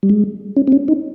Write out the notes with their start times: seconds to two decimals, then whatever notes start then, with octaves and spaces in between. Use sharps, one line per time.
0.03 G3
0.10 G#3
0.57 C#4
0.67 C4
0.72 C#4
0.88 D#4